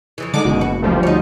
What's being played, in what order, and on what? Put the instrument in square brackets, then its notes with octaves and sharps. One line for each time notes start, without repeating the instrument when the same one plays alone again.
[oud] F2 C#3 E3
[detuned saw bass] D3 [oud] G#3 D4 D#4 [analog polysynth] D6
[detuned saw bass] F#1 [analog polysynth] B2
[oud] F#4
[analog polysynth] D2 F3 G3
[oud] D#4 C#5